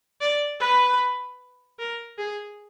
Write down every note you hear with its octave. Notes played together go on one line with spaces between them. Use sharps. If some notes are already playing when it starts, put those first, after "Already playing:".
D5
B4
A#4
G#4